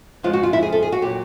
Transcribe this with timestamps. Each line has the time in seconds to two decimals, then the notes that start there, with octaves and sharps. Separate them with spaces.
0.23 F2 C#3 F3 G#3 F4
0.33 F#4
0.43 F4
0.53 E4
0.63 G#4
0.72 A4
0.83 G#4
0.92 F#4
1.02 A#2 F#3 G4